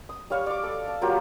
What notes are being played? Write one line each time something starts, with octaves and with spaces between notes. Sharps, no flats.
D#6
G3 C#5 F5 C#6
D5 D6
A4
A5
F#3 A#3 F4 G4